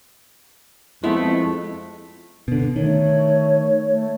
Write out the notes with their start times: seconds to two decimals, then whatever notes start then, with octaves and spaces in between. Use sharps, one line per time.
1.04 F2 G#3 A3 B3 E4
2.48 B2 D3
2.76 D#3 A3 C#5
3.88 A3